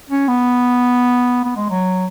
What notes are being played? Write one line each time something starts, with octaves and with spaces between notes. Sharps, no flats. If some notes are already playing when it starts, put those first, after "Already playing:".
C#4
B3
B3
G#3
F#3